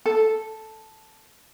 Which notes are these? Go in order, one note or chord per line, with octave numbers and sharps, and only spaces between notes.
A4